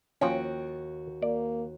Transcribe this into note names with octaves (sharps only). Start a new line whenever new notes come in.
D#2 F3 C#4 F#4 G5
A#3 D5